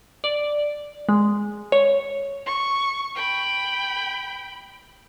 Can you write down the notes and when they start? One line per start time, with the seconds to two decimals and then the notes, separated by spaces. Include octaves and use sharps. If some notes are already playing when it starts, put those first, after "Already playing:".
0.24 D5
1.09 G#3
1.72 C#5
2.46 C#6
3.16 G5 B5